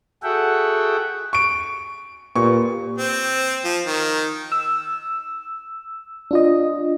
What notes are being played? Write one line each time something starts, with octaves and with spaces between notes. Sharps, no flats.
F#4 G#4 A4 E5 F#5 G5
C#6 D7
A#2 A#3 G4 B4 C#6
C4
F3
D#3
E6
D4 F4 D#5